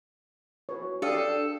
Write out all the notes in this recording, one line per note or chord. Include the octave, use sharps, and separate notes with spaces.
F#4 B4 C#5
D4 G4 A4 F5 D#6